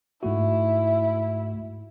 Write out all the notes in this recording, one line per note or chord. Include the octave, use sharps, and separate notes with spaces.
G#2 A3 E4 F#4